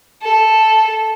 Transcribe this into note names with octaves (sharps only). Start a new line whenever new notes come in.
A4